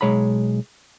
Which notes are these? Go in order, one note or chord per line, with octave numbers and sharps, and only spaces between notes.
B1 E2 G#3 C#5 A#5 B5